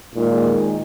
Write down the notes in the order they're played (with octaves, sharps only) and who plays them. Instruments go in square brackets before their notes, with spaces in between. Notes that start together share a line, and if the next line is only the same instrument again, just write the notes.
[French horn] A#2 [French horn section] D#3 G#3 D#4 G#4